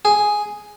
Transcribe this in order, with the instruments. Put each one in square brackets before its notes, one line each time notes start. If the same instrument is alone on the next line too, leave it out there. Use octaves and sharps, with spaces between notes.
[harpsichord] G#4